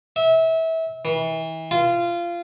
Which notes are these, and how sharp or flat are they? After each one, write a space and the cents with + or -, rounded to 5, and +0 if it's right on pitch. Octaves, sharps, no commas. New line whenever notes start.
E5 -25
E3 -35
F4 -20